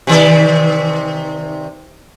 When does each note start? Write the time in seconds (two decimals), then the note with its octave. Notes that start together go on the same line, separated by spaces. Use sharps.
0.07 C3 D#3 D5